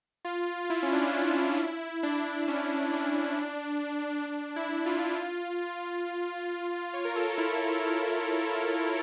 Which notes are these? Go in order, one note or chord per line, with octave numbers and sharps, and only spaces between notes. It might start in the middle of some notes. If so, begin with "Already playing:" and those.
F4
F4
E4
C#4
D4
D4
C#4
E4
D4
E4
D4
E4
D4
C#4
C#4
D4
D4
E4
F4
C#5
A#4
A4
F4
E4